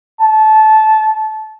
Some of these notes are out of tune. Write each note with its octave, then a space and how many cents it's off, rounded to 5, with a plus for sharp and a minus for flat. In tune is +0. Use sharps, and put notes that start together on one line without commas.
A5 -20